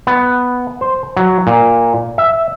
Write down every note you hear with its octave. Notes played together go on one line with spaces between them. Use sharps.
B3
C5
F#3
A#2
E5